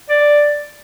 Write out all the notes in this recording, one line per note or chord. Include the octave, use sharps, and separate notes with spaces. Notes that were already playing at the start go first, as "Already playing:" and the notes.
D5